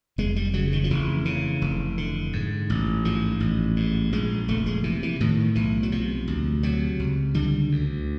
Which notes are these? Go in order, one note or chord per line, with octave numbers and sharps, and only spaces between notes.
F1 G#3
G3
C#3 F#3
D#3
F3
F1 E3
C#3
F1
D3
G#2
A1
G#2 F3
A1
G#2
A#1 G#3
F1 A3
G#3
C3 E3
E3
A2 D#3
B1 E3
F#3
C3 F3
D2
C3 F#3
C#2
D3 G3
D2